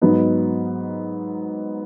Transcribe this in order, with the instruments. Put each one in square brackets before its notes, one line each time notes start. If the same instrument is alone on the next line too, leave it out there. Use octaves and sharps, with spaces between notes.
[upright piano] G#2 F#3 B3 D#4